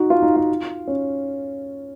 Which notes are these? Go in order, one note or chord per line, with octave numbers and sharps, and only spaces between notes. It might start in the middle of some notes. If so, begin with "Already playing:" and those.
Already playing: D#4 F#4
F4
D#4
F4
C#4